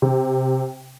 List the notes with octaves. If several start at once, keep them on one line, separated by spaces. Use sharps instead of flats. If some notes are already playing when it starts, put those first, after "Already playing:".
C3